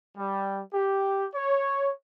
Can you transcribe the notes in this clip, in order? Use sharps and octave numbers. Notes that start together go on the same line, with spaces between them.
G3
G4
C#5